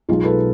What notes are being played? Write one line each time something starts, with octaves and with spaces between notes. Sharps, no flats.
B1 B2 G#3 D#4 F4
A4 B4